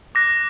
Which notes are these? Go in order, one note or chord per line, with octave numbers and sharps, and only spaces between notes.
D6 F#6 A#6